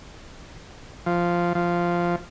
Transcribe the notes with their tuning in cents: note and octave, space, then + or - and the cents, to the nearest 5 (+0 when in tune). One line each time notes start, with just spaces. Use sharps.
F3 -5
F3 -5